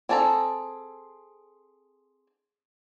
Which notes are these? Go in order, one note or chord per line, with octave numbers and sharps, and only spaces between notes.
C4 G#4 A4 C#5 A#5